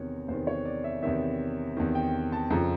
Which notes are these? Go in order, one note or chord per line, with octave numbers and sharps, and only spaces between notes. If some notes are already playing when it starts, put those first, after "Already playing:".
Already playing: E2 C3 D#3 C#5
E2 C3 D#3 C5
C#5
D5
E5
E2 C3 D#3 E5
E2 C3 D#3
G5
A5
F2 C#3 F3 A#5